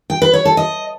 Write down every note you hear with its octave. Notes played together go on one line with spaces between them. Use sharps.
G5
B4
C#5
A4
D#5